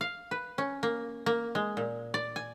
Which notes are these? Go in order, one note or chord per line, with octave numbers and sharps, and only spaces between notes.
F5
B4
C#4
A#3
A#3
G#3
A#2
D5
G#5